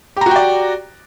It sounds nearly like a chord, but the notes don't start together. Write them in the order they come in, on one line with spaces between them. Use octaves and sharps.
G4 A#5 F#4 G5 D5